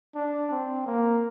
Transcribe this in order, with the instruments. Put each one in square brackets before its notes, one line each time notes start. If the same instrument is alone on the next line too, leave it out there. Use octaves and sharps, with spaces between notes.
[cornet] D4
C4
A#3